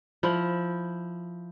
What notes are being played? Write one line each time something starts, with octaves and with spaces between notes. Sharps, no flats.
F3 E4